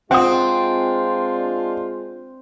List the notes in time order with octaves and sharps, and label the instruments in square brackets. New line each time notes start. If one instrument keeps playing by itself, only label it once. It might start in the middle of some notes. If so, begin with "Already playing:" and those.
[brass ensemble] G#3 D4 F4 [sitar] C4 [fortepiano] F#5 D#6